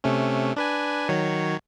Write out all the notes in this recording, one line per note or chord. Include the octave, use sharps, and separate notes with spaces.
C3 A3 C#4
D4 B4 G#5
D#3 F#3 C#5